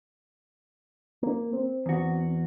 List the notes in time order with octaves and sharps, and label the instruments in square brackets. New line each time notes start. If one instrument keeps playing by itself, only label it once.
[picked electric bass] A#3
C4
[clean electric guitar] E2 F#4